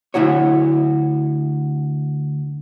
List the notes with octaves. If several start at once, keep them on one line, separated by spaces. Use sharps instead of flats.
D2 E4 F#4 C#5